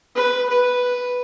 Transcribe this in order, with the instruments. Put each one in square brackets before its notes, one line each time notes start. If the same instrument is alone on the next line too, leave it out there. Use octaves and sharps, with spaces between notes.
[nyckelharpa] B4
B4